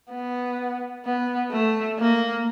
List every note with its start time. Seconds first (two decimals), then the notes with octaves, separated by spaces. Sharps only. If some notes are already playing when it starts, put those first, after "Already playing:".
0.12 B3
1.05 B3
1.51 A3
1.99 A#3